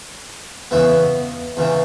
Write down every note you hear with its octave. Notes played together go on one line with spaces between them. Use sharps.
E2 C#3 E3 B3 E4
E2 C#3 E3